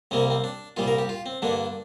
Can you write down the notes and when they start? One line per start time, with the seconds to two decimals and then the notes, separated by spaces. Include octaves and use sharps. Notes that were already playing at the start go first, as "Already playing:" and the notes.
0.11 C2 C3 G3 A#3 C4
0.31 C4
0.44 D4
0.77 C2 A#2 G3 F4
0.88 A#4
0.99 G4
1.09 F4
1.26 C4
1.42 G2 D3 A#3 D4